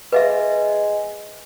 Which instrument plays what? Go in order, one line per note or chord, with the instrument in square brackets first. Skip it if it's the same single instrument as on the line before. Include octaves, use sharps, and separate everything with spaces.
[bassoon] G#3 [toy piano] B4 D#5 E5